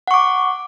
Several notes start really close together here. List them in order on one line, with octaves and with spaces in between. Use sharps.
F#5 C#6 D6